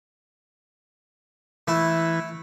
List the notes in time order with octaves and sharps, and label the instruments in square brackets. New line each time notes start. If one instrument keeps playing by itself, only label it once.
[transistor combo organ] E3 [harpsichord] A3 E4